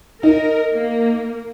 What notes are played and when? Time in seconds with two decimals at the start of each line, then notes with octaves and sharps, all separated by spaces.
0.23 D#4 A#4
0.73 A#3